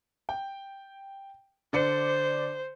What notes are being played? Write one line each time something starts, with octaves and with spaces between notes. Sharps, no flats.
G5
D3 C5 D5 C#7